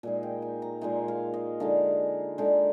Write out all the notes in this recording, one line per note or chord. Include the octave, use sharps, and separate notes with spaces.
A#2 G#3 D#4 G#5
G5
G#5
A#5
A#2 G#3 D#4 G#5
F5
D#5
D3 G#3 D#4 F5
D3 G#3 D#4